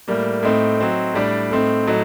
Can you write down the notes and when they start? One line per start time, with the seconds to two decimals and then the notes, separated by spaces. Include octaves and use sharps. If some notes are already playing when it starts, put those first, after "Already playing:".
0.08 A2 G3 A#3
0.43 A2 A3 C4 D#4
0.78 F#3 C4 D#4
1.14 A2 G3 D4
1.50 A2 A3 C4 D#4
1.86 A2 F#3 A3 D#4